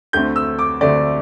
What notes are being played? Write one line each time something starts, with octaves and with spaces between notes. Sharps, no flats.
D2 D3 A3 C4 G6
E6
D6
D2 D3 A3 C4 D5